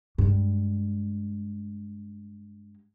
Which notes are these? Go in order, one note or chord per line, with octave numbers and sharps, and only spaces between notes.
G2 G#3